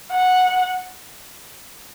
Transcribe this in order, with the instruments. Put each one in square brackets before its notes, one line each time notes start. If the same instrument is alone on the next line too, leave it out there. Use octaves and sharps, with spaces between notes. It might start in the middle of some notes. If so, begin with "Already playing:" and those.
[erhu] F#5